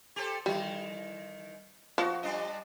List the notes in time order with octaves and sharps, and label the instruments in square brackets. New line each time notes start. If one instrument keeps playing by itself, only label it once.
[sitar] G4 A4 C5
[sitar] D#3 E3 [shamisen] G3
[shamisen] F3 [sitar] F#4
[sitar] G3 D4 D#5